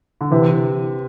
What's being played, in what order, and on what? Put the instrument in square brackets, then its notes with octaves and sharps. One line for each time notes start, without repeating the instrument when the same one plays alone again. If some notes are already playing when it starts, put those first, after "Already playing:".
[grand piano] D3
[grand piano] C3 [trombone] E3